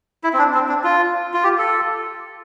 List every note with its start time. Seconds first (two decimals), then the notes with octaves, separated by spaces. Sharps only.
0.24 E4
0.33 C4
0.38 D4
0.54 C4
0.69 D4
0.84 F4
1.34 F4
1.44 G4
1.58 A4